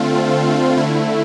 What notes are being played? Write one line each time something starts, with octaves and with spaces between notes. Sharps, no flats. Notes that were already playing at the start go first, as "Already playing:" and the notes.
Already playing: D3 A3 C4 F4
D3 A3 E4